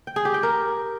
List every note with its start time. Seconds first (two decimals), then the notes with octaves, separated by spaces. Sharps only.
0.07 G5
0.16 G#4
0.25 G4
0.34 G5
0.43 A#4